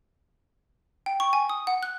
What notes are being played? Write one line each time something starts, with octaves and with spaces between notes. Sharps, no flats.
G5
C#6
G#5
D#6
F#5
F#6